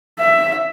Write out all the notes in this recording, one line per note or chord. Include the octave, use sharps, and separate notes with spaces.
E5